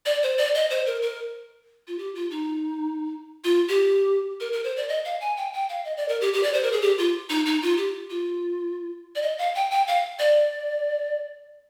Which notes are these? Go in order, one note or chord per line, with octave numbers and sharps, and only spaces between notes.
D5
C5
D5
D#5
C5
A#4
A#4
F4
G4
F4
D#4
F4
G4
A#4
A#4
C5
D5
D#5
F5
G#5
G5
G5
F5
D#5
D5
A#4
G4
G4
D5
C5
A#4
G#4
G4
F4
D#4
D#4
F4
G4
F4
D5
D#5
F5
G5
G5
F5
D5